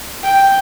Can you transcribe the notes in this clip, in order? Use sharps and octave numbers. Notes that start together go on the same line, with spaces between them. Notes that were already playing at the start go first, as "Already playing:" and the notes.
G5